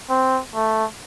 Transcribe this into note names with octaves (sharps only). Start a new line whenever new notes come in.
C4
A3